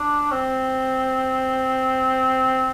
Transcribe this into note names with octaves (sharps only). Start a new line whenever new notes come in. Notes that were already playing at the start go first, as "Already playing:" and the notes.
Already playing: D4
C4